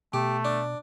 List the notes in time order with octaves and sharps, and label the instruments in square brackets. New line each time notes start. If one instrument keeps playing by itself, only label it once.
[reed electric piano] B2 [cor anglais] A3 [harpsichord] G4
[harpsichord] D4